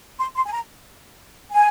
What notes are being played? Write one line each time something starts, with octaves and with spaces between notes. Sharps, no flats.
C6
C6
G#5
A#5
G#5